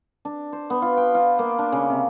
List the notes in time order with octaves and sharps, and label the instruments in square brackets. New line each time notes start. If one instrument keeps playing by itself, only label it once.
[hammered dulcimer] D4
C5
B3
F4
G5
F4
A#3
D4
C#3
C3